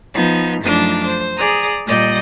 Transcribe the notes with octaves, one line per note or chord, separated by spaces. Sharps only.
F3 B3 D#4
F#2 F3 A3 D4 D#4 D6
C5
G#4 D5 A#5 D#6
A#2 G3 D5 D#5 G6